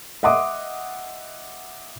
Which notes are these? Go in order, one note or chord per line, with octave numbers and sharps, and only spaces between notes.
D#5 E5 F#5 C6 D6 D#6